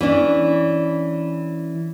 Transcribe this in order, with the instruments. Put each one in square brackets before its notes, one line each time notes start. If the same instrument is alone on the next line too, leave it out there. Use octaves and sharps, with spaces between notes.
[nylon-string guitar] E3 C#4 D4